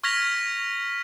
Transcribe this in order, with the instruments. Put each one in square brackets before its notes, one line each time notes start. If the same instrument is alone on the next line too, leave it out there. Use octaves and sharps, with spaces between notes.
[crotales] C#6 F6 G#6 A#6 B6 F7